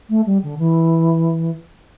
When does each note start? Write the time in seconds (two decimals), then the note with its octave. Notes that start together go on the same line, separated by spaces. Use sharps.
0.09 A3
0.26 G3
0.43 D3
0.58 E3